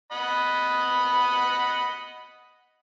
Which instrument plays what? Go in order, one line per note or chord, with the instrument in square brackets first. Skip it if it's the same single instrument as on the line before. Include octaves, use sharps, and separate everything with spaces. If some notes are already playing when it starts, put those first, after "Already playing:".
[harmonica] D#5 F#5 B5